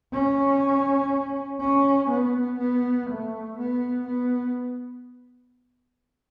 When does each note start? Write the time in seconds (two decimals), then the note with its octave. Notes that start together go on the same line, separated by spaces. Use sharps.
0.13 C#4
1.60 C#4
2.09 B3
2.59 B3
3.09 A3
3.58 B3
4.07 B3